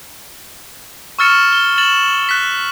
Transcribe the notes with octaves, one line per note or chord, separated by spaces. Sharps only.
C#6 E6 F6 A6 C#7 E7
G7
A6 E7 F#7
F#6 B6